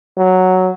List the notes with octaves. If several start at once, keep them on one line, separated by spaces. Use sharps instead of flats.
F#3